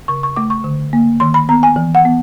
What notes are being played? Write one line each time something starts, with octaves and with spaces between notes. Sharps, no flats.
C#3 C#6
C#6
A3 D6
C#6
D3
A#3
D#3 C6
B5
B3 A#5
G#5
E3
F#5
B3